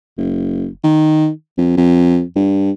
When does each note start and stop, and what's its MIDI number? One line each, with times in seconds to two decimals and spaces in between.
0.18 0.67 30
0.84 1.29 51
1.57 1.76 41
1.77 2.23 41
2.36 2.71 43